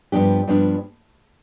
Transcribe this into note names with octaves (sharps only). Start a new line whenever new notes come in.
G2 F3 B3 D4 G4
G2 F3 B3 D4